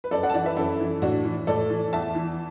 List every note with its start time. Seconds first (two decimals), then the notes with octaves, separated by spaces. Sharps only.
0.04 B4
0.11 F#2 A4 D5
0.23 D5 F#5
0.30 A5
0.34 E3 D5 F#5
0.46 B4 E5
0.57 F#2 E4 A4
0.80 E3
1.02 A2 D4 F#4
1.25 E3
1.47 A2 A4 D5
1.70 E3
1.93 E2 E5 A5
2.15 E3